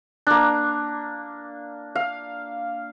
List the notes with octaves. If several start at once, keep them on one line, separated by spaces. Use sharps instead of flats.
A#3 D4
F5